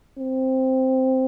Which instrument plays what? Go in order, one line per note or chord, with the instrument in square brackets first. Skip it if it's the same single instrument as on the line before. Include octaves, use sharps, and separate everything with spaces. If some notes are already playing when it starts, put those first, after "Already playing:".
[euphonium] C4